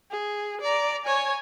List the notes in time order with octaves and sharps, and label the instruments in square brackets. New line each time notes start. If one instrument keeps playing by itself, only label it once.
[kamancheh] G#4
D5 A#5
C#5 G#5